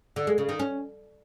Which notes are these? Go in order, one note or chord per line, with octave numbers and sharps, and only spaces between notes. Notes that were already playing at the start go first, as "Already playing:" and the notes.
D3
G#3
C#3
D#3
C#4